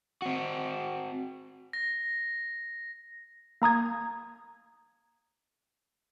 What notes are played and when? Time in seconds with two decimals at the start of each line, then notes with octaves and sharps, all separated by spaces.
0.22 C4 F#4
1.73 A#6
3.62 A#3 A#5 D#6 G#6